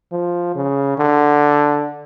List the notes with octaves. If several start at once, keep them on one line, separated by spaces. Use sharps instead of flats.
F3
C#3
D3